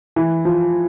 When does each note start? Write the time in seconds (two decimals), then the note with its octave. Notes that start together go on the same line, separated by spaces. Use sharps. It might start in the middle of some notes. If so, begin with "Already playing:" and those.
0.16 E3
0.45 F3